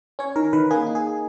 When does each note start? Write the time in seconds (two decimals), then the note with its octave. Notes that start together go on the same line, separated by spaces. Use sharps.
0.19 C#4 C#5
0.36 D#3 A#4
0.53 D#3 B4
0.71 A#3 G#4
0.86 D#4
0.95 G#4